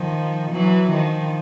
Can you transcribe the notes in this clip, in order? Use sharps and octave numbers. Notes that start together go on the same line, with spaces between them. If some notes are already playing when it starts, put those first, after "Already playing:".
Already playing: D#3 F3
E3 F#3
D#3 F3